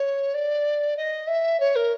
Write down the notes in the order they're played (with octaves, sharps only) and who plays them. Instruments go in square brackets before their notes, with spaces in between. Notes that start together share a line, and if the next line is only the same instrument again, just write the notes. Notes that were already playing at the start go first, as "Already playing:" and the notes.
Already playing: [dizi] C#5
D5
D#5
E5
C#5
A#4